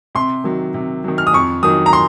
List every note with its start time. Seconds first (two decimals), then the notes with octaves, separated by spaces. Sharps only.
0.15 C3 C6
0.44 D#3 F#3
0.74 C3
1.04 D#3 F#3
1.18 F6
1.27 D#6
1.33 F2 C#6
1.63 D#3 F#3 D#6
1.86 A#5
1.93 C6